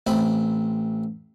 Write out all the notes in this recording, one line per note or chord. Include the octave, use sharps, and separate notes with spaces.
A1 C4 B5